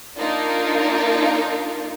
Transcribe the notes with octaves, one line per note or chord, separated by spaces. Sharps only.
A#3 D4 D#4 F4 A#4